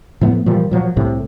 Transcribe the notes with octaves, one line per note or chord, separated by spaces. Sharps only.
A2 F3 A3 B3
A#2 E3 F3 G3
A#2 F3 F#3
C2 A2 C3